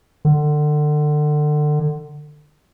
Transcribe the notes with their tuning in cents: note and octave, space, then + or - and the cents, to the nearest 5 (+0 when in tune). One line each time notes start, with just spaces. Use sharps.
D3 +30